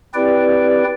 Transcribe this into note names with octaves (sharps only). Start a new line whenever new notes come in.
C4 E4 G4 B4 D5 G5